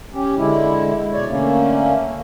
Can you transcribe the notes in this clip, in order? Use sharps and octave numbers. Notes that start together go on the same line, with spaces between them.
C#4 G4
D3 G#3 E4
B2 C#5 D5
D3 A3 A#3 C#4